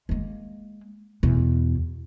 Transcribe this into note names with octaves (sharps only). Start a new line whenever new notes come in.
G#3 A#3
E2 B2